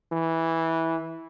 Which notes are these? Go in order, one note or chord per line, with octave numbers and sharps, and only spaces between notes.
E3